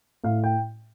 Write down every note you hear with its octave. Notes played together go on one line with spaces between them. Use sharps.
A2 F5
G5